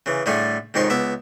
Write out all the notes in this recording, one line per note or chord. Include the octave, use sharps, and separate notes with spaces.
C#3 E3
A2 D3 G3 A3 G#4
F2 G#2 D#3 C#5 C6
C#2 B3 E5 D6